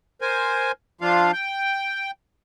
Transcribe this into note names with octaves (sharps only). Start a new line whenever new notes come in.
A#4 C5 G#5
F3 D4 F4 F5
G5